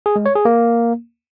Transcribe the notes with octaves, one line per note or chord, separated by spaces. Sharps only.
G#4
G#3
C#5
G#4
A#3